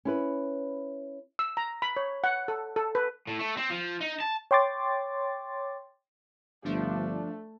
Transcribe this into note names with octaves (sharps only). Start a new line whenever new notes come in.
C#4 E4 B4
E6
A#5
B5
C#5
F#5
A4
A4
B4
A2
A3
C4
F3
D#4
A5
C#5 G5 C6 D6 A6
G1 F3 A3 D4